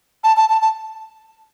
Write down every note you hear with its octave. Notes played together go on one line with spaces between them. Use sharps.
A5
A5
A5
A5